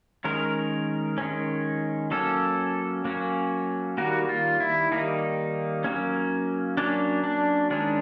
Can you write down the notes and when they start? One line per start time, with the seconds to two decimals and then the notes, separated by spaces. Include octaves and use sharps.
0.24 D#3 G#3 C#4 A#4
1.18 D#3 G#3 C#4
2.11 F#3 A#3 C#4 A4
3.05 F#3 A#3 C#4
3.98 D#3 G3 A#3 F#4
4.29 F4
4.60 E4
4.91 D#3 G3 A#3 D#4
5.84 F#3 A#3 C#4
6.77 F#3 A#3 C#4 D4
7.24 D4
7.70 D#3 G#3 C#4 D4